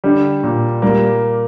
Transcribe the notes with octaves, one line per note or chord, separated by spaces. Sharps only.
D3 G3
A#2
G3 A#3